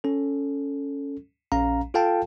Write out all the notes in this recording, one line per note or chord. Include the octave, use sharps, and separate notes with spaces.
C#4 A4
A#1 C#4 F5 A#5
F4 A4 F5 G5 A5